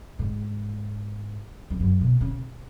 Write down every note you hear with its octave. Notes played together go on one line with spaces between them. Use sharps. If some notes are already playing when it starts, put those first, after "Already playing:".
G#2
F2
F#2
B2
C#3